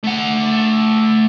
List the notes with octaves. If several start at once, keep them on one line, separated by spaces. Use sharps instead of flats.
A3 F#5